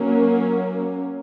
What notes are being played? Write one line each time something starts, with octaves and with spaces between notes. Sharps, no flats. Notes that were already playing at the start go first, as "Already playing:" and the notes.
Already playing: F#3 A#3 C#4